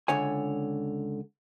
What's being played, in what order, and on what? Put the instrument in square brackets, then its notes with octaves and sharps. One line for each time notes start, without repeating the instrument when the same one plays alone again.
[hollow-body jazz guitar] C#2 D3 C#5 G#5